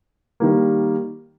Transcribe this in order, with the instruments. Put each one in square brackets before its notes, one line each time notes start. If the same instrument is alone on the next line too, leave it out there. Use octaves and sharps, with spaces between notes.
[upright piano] D#3 G3 A#3